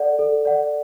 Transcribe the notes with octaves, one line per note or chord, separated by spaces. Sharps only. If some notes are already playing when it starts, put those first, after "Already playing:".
Already playing: A4 D5 F#5
A4
D5 F#5